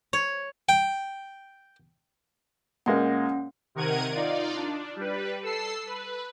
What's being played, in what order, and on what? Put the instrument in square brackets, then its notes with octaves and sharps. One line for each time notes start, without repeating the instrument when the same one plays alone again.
[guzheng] C#5
[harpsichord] G5
[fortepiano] A#2 G#3 A#3 [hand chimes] C#4 F#5
[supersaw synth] C3 D#3 A#4 F#5 G#6 D#7
D#4 F4 D5
D4
G3 B4
A4 E6 C7
B4